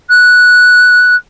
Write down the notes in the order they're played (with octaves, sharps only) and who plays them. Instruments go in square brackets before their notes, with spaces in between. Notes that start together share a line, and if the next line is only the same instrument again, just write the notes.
[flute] F#6